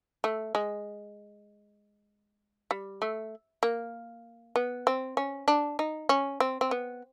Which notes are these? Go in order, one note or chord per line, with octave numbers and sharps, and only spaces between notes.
A3
G#3
G3
A3
A#3
B3
C4
C#4
D4
D#4
C#4
C4
C4
B3